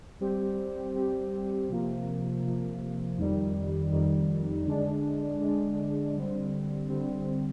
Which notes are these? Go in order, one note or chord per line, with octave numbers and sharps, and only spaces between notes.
G3 C4 G4
G3 C4 G4
C3 F3 A#3
C3 F3 A#3
F2 D#3 G3
F2 D#3 G3
D3 G#3 D4
D3 G#3 D4
D3 G3 C4
D3 G3 C4